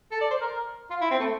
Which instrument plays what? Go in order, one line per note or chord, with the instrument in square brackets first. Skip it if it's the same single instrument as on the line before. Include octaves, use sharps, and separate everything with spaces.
[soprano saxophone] A4
D5
C5
A#4
F4
E4
C4
A3